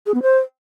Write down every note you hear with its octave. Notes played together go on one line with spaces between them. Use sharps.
G#4
B3
C5